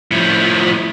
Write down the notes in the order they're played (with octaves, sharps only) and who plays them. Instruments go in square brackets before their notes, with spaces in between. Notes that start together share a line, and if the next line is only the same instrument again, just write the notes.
[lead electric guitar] A2 F3